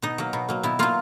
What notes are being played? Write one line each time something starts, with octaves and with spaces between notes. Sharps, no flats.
B2 D#4
F#3 A#3
B2
F#3 A#3
B2 E4
F#3 A#3 F4